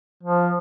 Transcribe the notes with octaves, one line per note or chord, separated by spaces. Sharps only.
F3